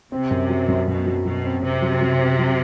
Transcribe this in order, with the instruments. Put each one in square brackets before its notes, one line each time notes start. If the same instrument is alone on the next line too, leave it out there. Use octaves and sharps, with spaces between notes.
[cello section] C3 [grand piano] C4
[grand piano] F#2
F#3
F#2
[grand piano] F#2 [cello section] B2
[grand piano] F#3
[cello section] B2 [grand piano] F#3
[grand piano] C4
[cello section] C3 [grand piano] C4
[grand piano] F#3
F#3
C4
F#3